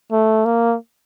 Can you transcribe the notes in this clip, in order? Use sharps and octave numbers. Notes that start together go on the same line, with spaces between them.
A3
A#3